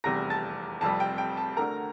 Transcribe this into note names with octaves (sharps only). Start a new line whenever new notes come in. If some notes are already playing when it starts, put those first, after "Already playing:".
F1 E2 C3 G3 A#5 A#6
A5 A6
F1 F2 C3 G3 A5
G5
G5
A5
D2 D3 A3 A#4 A#5